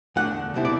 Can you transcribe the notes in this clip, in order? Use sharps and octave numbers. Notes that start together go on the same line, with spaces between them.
E2 D3 A3 D4 F#5
C2 B2 G3 C4 E4
D5